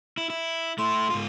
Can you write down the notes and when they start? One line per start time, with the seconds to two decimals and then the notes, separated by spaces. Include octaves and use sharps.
0.18 E4
0.30 E4
0.78 A3 E4 C6
1.10 G#2 F4